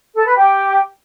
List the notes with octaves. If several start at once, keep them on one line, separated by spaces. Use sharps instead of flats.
A4
B4
G4